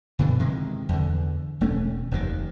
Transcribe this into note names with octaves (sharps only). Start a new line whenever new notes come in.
G2 B2 D3 F3
C3 D#3 E3 G#3
E2 D3
E1 A3 C#4
F1 D#2 G#2 D#3